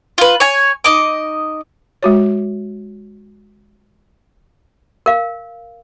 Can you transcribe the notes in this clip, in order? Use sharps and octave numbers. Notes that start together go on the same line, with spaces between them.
F4 B4
C#5 G#5
D#4 D#5 D6
G#3 F#4 C#5
A#4 F5